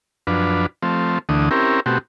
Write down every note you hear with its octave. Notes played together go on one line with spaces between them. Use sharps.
F#2 F3 D4 B4
F3 A3 C4
D2 D3 E3 A3 D#6
C4 C#4 E4 G4 A#4
B2 A3 C4 F#4 G4